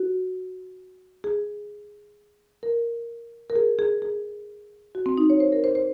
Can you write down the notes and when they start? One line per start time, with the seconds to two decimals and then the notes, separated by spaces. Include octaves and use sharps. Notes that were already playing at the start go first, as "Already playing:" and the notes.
Already playing: F#4
1.24 G#4
2.63 A#4
3.50 A#4
3.56 G#4
3.79 G#4
4.02 G#4
4.95 F#4
5.06 C4
5.18 D#4
5.30 C#5
5.40 C5
5.52 A#4
5.64 C5
5.75 C5